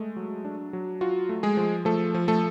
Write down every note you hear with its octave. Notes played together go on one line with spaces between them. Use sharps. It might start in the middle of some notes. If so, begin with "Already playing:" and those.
Already playing: G#3 A3
F#3
D4
F#3
F4 F#4
A3
G#3 G#4
F3
F3 A3 A4
F3
A3 A4